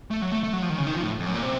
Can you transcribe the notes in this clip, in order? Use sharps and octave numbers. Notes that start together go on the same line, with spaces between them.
A3
F#3
A3
A3
F#3
F3
D#3
C#3
D#3
F3
A2
F2
F#2
A#2
C3